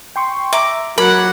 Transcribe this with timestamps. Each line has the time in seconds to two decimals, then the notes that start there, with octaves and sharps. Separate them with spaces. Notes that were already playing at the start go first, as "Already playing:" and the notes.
0.16 G5 C6 C#6
0.53 E5 A#5 D6
0.98 F#3 A#4 F#5 B5 D6 G#6